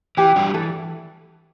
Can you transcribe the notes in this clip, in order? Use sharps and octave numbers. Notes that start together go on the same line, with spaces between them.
E3 G4
G3 D4 F#4
E3 A4